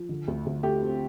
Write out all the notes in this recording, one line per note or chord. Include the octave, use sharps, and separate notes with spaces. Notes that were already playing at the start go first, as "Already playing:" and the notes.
Already playing: F3
D3
D2
D2
A3 G4
C4